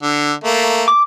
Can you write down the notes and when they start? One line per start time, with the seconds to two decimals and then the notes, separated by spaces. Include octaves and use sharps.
0.02 D3
0.44 A3 A#3
0.88 D6